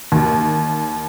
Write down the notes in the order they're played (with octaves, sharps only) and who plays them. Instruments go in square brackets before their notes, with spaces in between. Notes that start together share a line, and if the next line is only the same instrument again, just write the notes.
[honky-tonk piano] D#2